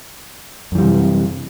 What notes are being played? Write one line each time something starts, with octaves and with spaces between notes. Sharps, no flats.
F#2 C3 E3 G3